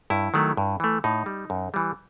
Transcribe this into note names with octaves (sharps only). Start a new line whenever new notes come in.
G2 E4
D#3 F#3 A3
G2
E3 A3
A2 D#4
G3
F#2
E3 G3